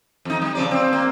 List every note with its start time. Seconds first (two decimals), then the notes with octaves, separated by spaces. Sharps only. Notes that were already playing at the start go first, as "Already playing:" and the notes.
0.25 F2 D#4
0.42 G3
0.55 C#3 F3 D5
0.71 C4
0.93 A#3